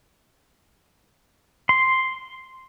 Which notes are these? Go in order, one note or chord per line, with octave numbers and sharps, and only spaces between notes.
C6